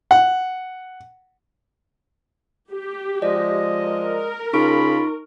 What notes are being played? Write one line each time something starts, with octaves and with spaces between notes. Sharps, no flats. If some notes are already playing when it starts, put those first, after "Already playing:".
F#5
G4
F3 G#3 D5 D#5
A#4
C#3 D#4 F4 B5 C#6 D7